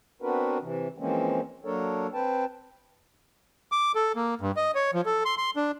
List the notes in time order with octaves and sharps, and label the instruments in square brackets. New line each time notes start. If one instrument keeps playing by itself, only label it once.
[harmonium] B3 C4 D4 F#4 A#4 B4
C3 E3
E3 F3 G#3 A#3 C4 C#4
F#3 A#3 D4 A4 A#4 C#5
C4 B4 G5 A5
[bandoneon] D6
A4
A#3
G2
D#5
C#5
F3
A4
C6
C6
D4